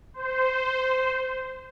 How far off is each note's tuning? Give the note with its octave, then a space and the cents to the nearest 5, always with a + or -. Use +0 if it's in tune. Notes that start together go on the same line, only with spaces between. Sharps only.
C5 -15